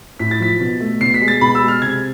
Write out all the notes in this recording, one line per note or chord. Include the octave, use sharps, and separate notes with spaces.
A2 B6
A6
F3 B6
B2
A3
B2 C7
B6
G#3
A6
B2 B5
E6
G#3
F6
C3 G#6